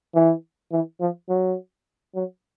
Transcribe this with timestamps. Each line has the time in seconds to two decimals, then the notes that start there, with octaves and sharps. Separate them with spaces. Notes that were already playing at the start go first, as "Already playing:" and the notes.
0.14 E3
0.72 E3
1.00 F3
1.29 F#3
2.15 F#3